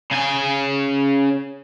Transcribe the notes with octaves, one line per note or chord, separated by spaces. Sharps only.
C#3 G#5